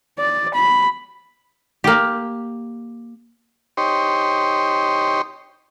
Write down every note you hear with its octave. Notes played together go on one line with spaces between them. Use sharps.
D5
B5
A#3 G4
D#4 G4 C5 C#5